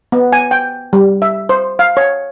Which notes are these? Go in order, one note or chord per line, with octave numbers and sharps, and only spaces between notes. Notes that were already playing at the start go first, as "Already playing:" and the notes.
B3
G#5
G5
G3
E5
C5
F5
C#5